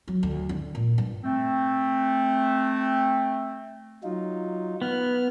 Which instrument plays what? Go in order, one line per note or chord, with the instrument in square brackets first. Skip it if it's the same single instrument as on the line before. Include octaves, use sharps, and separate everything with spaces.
[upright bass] F#3
D2
D3
A#2
G2
[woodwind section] A3 C4
[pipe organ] F#3 D#4 F4
[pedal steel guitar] B3 [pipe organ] F6